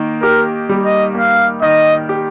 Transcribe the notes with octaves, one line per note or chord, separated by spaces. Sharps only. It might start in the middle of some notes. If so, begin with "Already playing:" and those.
Already playing: D#3 A#3
G4 A#4
G3
D#5
A#3 F5
D#3 D#5
G4